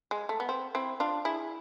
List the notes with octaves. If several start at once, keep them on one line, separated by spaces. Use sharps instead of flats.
G#3
A3
B3
C4
C4 E4
D4 F4
E4 G#4